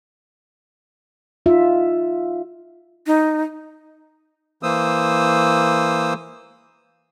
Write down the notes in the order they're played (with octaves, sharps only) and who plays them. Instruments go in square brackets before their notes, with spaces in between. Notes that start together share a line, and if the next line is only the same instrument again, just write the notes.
[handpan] D#4 F4 E5
[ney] D#4
[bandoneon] E3 A#3 C5 D#6 E6